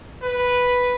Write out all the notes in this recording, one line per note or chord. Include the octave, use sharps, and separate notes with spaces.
B4